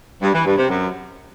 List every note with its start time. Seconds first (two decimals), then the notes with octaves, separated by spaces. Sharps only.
0.21 G2
0.33 E3
0.45 G2
0.57 C3
0.69 F#2